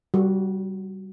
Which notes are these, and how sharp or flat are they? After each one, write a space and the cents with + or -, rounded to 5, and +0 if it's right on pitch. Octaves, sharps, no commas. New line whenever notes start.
G3 -25 F#4 +0